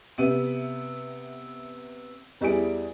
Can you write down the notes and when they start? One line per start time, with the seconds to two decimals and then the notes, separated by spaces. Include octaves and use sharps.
0.18 C3 B3 E5 D#7
2.41 E2 G3 E4 G#4 D7